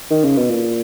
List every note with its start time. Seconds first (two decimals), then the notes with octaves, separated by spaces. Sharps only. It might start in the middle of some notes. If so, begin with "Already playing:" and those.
0.11 D#3
0.24 C#3
0.37 B2
0.50 A#2